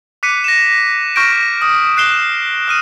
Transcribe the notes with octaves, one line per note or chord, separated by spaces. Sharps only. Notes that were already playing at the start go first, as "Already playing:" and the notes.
D6 F#6 B6 C#7 D#7
A#6 E7
C#6 F6 G6 A#6 D7
D#6
F#6 C7 E7 G7
D#6 F6 D#7